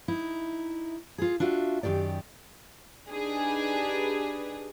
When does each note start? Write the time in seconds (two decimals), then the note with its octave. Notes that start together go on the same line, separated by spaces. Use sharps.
0.08 D#4 E4
1.18 F4 G#4
1.40 D4 F4 F#4 E5
1.83 F#2 A#2 D#3 G4 D5
3.12 D4 D#4 G4 G#4 B4